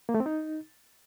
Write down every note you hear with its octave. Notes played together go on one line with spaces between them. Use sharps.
A#3
A3
C4
D#4